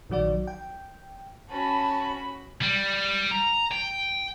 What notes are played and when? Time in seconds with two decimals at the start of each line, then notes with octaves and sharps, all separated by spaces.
0.09 A#1 D#3 F#3 F#4 D5
0.47 G5
1.50 C#4 F#4 A5 B5
2.62 G3
3.31 A#5
3.71 G5